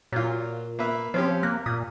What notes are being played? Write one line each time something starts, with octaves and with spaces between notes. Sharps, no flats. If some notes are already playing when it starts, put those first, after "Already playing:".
A#2 F#3 F4
A#3 B4 E5
F3 C4 C#4 G4
A#3 F#6
A#2 D#6